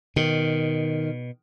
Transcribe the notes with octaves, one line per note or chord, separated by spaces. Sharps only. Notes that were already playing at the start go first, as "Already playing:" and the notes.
B2 D#3